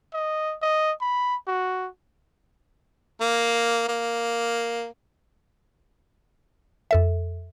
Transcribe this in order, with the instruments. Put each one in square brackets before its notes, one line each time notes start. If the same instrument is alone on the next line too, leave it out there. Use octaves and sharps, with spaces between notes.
[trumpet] D#5
D#5
B5
F#4
[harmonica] A#3
A#3
[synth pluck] F2 A4 E5